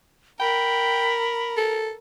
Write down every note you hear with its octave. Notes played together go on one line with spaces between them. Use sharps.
A#4 G5 B5
A4